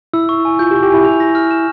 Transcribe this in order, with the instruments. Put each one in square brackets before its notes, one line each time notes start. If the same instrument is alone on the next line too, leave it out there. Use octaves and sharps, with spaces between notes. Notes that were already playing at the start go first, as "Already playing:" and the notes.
[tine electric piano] E4 [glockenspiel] E6
[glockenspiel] C#6
G#5
[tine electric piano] F4 [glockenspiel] G6
[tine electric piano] G4
[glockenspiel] C#6
[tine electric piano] G4
[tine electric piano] E4 [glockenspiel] G#5
[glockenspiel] F7
A#6
F6
E7